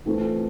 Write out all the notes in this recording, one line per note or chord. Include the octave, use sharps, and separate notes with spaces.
E3 A3 C4 F4